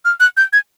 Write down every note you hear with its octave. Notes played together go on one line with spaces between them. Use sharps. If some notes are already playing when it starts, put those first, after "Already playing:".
F6
F#6
G6
G#6